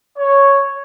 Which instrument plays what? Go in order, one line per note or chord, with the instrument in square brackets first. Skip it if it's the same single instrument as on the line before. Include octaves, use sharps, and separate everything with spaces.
[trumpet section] C#5